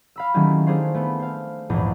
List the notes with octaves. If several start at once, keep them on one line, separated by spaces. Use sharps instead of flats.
F5 B5 E6
D#3 F#3 A3 C#4 E4 G4
A3 D4 G#4 C5 F5 C6
A3 B3
C5 F5
A#1 E2 G#2